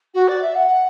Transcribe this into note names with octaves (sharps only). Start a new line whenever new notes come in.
F#4
D5
E5
F#5